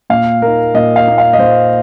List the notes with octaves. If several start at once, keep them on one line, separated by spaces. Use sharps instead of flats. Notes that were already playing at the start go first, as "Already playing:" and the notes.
A#2 F5
A#3 D#4 A#4
A#2 D#5
F5
A#3 D#4
F5
D#5
A#2 C5